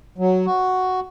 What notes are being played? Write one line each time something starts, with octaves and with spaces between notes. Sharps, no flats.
F#3
F#4